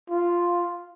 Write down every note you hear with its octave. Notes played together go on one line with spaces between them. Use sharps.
F4